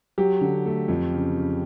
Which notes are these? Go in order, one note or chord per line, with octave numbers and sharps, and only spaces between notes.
F#3 G4
D3
A3
F2
C#3
C#3